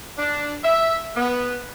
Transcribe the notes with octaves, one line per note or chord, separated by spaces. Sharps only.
D4
E5
B3